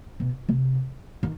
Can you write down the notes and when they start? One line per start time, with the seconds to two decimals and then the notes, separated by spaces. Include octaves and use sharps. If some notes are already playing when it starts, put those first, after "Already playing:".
0.20 B2
0.49 C3
1.23 D#3